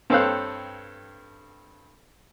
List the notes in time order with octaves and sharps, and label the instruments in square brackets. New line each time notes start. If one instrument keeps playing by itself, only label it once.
[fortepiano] G2 C4 A4 C#5 F5 F#6